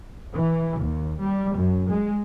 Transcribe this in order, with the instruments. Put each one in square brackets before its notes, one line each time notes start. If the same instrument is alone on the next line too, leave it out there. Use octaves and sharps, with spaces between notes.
[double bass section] E3
D#2
G3
F#2
G#3